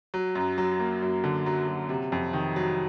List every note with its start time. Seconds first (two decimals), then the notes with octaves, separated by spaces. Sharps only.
0.14 F#3
0.35 F#2
0.58 F#3
0.80 A#3
1.02 F#2
1.24 D3
1.46 F#3
1.68 F#3
1.89 C3
2.12 F2
2.33 D#3
2.56 F#3